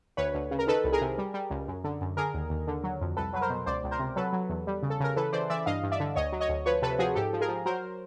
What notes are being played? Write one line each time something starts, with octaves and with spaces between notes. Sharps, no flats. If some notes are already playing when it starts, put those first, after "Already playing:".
D2 B4 C#5
D2
C#3
A#4
D#3 A4 B4
C2
G#4 A#4
C3
G3
G3
C#2
F#2
D3
F#2
D3 G#4 A#4
D#2
D#2
D3
F#3
F2
C2 A4 B4
F#3 B4
A#4 C5
B2
C#2 C5 D5
C#2
A#4 C5
C3
F#3 A4 B4
F#3
E2
G3
C#3
A4
C#3 A#4
E3 A4 B4
E3 C5 D5
E3 D5 E5
G2 D#5 F5
G2
D5 E5
D3
D2 C#5 D#5
F#3
C#5 D#5
D2
F3 B4 C#5
C3 A4 B4
F3 F#4 G#4
G#2 G4 A4
F3
G#4 A#4
F3
F#3 A#4 C5